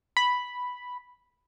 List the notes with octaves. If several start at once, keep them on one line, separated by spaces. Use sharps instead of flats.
B5